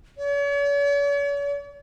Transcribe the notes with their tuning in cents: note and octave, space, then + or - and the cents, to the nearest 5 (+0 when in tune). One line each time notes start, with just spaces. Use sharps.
C#5 +45